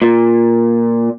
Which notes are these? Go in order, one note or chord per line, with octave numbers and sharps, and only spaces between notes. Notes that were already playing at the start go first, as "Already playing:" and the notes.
A#2